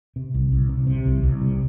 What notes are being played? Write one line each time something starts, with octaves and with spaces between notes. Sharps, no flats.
C3
C2
C2
C3
C3
C2
C2
C3